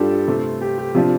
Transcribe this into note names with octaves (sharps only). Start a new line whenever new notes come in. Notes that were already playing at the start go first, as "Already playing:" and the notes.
Already playing: G2 G3 D4 F4 G4 A4
C3 A3 C4
G4
G4
C3 F3 D4 F4